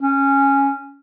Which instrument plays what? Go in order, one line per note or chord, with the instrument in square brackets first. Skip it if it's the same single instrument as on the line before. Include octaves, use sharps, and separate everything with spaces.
[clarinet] C#4